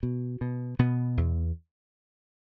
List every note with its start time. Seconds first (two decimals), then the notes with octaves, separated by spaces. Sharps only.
0.03 B2
0.41 B2
0.79 B2 B3
1.17 E2